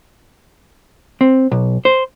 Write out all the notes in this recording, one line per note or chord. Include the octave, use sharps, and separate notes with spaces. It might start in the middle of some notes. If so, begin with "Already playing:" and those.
C4
B1
C5